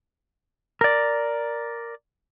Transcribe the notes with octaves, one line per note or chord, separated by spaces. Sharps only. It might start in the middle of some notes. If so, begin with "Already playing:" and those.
A#4 D5